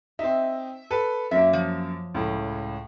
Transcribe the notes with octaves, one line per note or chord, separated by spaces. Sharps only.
C4 D#4 E5
A4 B4
F#2 A#3 E5
F3
C#2 A2